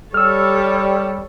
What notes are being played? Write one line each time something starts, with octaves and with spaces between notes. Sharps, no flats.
G3 A4 C#5 E6 F6